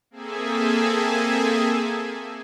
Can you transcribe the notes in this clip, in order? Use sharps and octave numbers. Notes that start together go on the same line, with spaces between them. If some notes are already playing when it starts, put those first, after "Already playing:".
A#3 C4 G#4 A4 E5 G#5